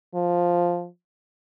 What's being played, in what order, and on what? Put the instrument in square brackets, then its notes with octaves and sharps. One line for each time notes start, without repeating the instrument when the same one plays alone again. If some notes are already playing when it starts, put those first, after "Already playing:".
[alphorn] F3